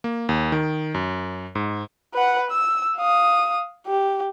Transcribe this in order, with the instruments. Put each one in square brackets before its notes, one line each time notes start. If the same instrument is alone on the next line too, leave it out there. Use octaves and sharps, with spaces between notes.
[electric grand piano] A#3
D#2
D#3
F#2
G#2
[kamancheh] B4 F#5
E6
F5 D#6
G4